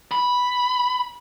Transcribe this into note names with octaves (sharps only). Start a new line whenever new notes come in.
B5